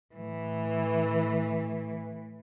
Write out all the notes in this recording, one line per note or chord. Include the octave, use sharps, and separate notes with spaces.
A2 E3